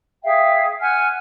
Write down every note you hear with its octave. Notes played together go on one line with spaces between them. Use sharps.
G#4 E5 F5 G5
F#5 G#5 F6